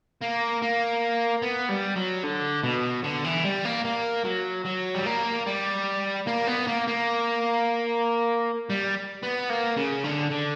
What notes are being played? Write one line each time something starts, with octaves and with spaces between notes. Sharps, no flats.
A#3
A#3
B3
G3
F#3
D3
B2
D3
E3
G3
A#3
A#3
F#3
F#3
G3
A#3
G3
A#3
B3
A#3
A#3
G3
B3
A#3
C#3
D3
D3